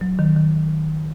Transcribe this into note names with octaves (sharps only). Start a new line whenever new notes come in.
F#3
D#3
D#3